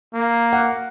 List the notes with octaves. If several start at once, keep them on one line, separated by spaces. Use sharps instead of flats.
A#3
F#5